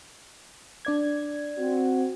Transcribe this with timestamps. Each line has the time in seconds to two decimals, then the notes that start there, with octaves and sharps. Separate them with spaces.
0.85 D4 D5 G#6
1.57 C4 F#4